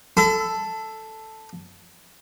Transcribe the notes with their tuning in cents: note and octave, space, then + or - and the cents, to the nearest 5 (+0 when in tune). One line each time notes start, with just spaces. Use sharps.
A4 +0 B5 +45